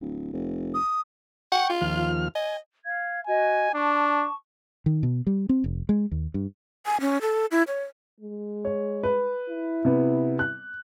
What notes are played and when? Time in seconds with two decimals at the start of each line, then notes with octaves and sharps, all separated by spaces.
0.01 D1
0.33 F1
0.74 D#6
1.52 F#5 G5 C#6
1.70 F4
1.81 D#2 F3 F6
2.35 D#5 G#5
2.83 F5 G#6
3.26 F#4 D#5 G#5
3.74 D4 A5 C#6 D6
4.86 D#3
5.03 B2
5.27 G3
5.49 C4
5.64 F1
5.89 G#3
6.11 D#2
6.34 G2
6.86 G#5
7.01 C#4
7.21 A4
7.51 E4
7.68 C#5
8.20 G#3
8.65 C#5
9.03 B4
9.49 E4
9.85 C3 B3
10.39 F#6